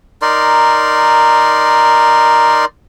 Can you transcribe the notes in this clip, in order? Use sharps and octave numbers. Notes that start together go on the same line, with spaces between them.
D#4 A#4 D5 C6